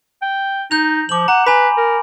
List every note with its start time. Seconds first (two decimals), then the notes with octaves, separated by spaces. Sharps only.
0.22 G5
0.71 D#4 G6 F7
1.09 F3 D6 F#7
1.28 F#5 A#5
1.47 B4 G#5 B5
1.77 A#4